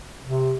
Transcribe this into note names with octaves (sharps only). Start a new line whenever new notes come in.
C3